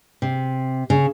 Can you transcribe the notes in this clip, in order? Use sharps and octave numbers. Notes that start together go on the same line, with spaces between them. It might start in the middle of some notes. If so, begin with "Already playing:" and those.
C3
C#3